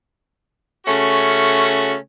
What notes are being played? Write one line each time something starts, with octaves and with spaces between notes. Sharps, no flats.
C#3 A3 C#4 F#4